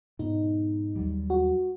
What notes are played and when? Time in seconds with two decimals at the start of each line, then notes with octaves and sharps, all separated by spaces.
0.19 G#2 B2 B3 D#4
0.95 D#2 F#3 G3
1.30 F#4